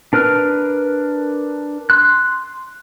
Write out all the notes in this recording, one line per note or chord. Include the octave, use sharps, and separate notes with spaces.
D4 A#4 B4 F6
C6 F#6